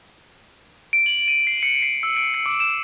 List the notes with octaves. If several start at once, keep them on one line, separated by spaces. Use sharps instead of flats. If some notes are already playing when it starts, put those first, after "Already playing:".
D7
F#7
D#7
C7
C#7
C7
E6
D7
C#7
D6
E7